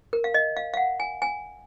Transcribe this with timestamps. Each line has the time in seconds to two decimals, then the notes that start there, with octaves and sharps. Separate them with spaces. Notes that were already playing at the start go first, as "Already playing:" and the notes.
0.13 A#4
0.24 F5
0.34 D#5
0.57 F5
0.74 F5
0.77 F#5
1.00 G#5
1.22 G#5